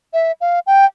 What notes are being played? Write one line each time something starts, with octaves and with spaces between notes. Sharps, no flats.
E5
F5
G5